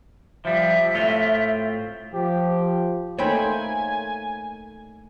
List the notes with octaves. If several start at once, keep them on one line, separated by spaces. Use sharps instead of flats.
F3 G3 E5
A2 C4 F4
F3 G4
A3 A#3 D#4 C5 C#5 G5 G#5 B5